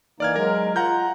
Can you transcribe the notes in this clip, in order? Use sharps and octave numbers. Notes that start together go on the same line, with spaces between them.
E3 A#3 D#4 D5 F6 G#6
F#3 G#3 A#4
F4 F#5 A#5 G6